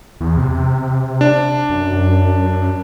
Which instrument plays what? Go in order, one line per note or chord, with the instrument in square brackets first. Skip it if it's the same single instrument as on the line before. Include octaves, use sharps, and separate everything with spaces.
[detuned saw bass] E2
C3
[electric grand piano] D4
[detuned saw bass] F#2